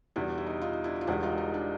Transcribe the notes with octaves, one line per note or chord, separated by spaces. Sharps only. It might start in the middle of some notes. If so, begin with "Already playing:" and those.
E2 B2 G3 D4 E4
E4
D#4
D#4 F4
D4 E4
F4
E1 E2 B2 G3 D4 E4
D#4 F4
D#4
D4